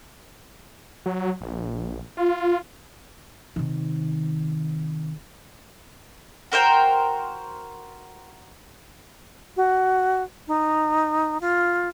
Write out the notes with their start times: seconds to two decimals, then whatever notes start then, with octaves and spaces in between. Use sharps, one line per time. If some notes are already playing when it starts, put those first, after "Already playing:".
1.06 F#3
1.41 A#1
2.17 F4
3.56 C3 D#3
6.52 F#4 A#4 C5 G5
9.57 F#4
10.48 D#4
11.41 F4